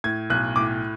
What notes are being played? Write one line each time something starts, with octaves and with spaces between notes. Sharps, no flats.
A2 G#6
B1 F#6
A2 D6